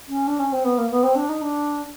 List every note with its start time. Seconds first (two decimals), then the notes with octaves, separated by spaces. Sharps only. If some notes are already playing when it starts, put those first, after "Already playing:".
0.08 C#4
0.27 D4
0.39 C#4
0.53 C4
0.65 B3
0.78 A#3
0.91 B3
1.03 C4
1.15 D4
1.29 D#4
1.41 D4